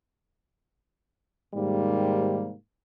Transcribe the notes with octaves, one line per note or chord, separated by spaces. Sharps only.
G#2 C3 D#3 G3 A#3